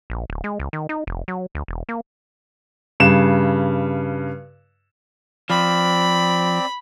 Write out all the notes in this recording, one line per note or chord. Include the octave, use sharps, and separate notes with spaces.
A#1
D1
G#3
C#2
D#3
D#4
F1
F#3
D2
E1
A#3
G2 C#3 E7
F3 C4 D5 B5